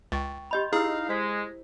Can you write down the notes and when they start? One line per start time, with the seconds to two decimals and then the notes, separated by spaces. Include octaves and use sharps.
0.12 C#2 G5 C#6 A6
0.51 G4 D#5 B5 C6 G6 F7
0.73 D#4 E4 G#4 F5 E6
1.09 G#3 C5 B6